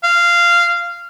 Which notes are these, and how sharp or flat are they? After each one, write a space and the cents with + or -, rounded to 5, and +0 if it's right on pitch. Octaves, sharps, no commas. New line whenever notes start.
F5 -15